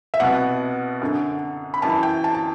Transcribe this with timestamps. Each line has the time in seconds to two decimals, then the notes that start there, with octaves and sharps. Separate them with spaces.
0.14 E5
0.20 C2 B2 F#5
1.02 F#2 D3
1.74 B5
1.82 F#2 E3 A5
2.03 G5
2.24 A5
2.35 A5